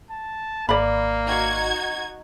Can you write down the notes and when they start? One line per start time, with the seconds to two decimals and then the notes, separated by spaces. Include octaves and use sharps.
0.11 A5
0.69 G#1 A#3 D5 B5
1.26 D#4 F#4 G#6